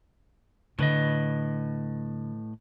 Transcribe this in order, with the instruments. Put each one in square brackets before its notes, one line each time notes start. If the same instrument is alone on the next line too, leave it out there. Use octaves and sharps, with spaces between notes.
[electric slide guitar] A2 B4 D#5 [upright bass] D3